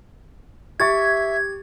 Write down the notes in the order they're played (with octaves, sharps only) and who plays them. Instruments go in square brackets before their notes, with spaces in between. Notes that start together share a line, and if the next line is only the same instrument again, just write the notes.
[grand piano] G4 C#6 A6 [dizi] E5 [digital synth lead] G#6